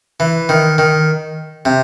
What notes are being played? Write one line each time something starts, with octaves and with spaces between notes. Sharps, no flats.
E3
D#3
D#3
C3